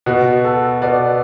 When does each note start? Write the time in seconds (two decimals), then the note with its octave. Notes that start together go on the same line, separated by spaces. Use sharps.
0.06 B2 B3 F#4
0.44 A4
0.82 B2 B3 D5